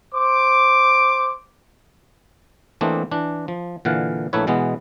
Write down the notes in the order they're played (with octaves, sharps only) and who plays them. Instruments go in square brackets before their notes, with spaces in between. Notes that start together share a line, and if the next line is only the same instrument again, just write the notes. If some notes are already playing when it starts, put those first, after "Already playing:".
[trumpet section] C5 D6
[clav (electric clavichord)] E3 A3 A#3 C4 D4 D#4
E3 D4
F3
A#2 D3 E3 F5 F#5
A#1 A3 A#3 E4 B4 C#5
B2 E3 G#3 B3